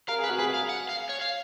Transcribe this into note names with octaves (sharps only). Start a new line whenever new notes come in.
A#4 F5
G#4
B4
F#4
G#4 B4
F5
F#5
F5
C#5
F5